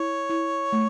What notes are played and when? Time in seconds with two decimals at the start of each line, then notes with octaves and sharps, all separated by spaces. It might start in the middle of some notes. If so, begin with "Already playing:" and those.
Already playing: E4 C#5
0.29 E4
0.72 A3